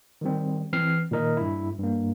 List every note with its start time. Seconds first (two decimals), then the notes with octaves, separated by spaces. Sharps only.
0.21 D#3 G3 C4
0.73 E3 C4 F6 C7
1.11 A#2 D#3 A#4 D#5
1.37 G2 E4
1.79 G2 A#3